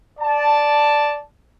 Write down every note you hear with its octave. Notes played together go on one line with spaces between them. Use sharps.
D5 A5